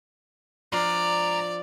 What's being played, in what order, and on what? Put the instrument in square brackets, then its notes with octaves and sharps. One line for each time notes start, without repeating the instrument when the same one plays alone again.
[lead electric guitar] G#2 A#5 [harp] F3 D4 F4 [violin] D5